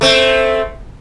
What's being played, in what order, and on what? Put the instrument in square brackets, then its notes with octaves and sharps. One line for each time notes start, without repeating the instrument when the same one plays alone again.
[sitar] A3 C4